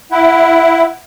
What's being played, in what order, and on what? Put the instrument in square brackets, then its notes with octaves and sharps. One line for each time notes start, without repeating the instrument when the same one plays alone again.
[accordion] E4 [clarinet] F#5